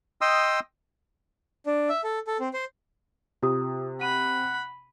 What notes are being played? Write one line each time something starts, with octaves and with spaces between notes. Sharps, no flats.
D#5 G5 C6 D#6 E6
D4
E5
A4
A4
C4
C5
C3 F4 G4 D#6
F#5 B5 D#7